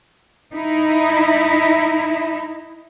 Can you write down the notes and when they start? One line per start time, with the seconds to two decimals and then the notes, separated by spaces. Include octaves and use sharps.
0.54 D#4 E4